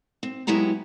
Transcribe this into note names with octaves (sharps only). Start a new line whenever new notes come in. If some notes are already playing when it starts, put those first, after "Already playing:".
C4
F#3 G#3 B3 E4 G4 A#5